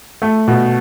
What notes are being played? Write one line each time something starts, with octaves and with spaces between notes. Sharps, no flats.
A3
B2